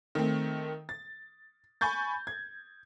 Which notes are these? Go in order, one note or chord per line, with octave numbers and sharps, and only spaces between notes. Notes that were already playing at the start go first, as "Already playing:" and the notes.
D#3 A3 C4
A6
G#5 B5 C#6 G6 A6
G#6